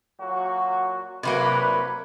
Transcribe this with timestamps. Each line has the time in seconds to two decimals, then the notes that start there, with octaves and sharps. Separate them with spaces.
0.21 A#2 F#3 F#4
1.23 C2 C3 F#3 A#3 B4